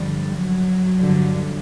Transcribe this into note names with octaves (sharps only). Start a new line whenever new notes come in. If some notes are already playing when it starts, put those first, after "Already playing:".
Already playing: G2 D3 F3 G3
F#3
G2 D3 F3